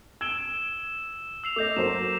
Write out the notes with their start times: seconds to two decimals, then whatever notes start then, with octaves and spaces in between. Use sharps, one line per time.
0.21 E6 G#6 D7 E7 G7
1.44 E6 C7 F7
1.56 A3 D#5 D6 G6 A#6
1.76 F#3 A#3 C5 E7